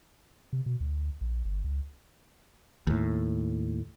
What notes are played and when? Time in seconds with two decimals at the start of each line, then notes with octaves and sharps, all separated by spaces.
0.53 C3
0.66 B2
0.80 D2
1.21 A#1
1.45 G1
1.64 C#2
2.87 D#2 A2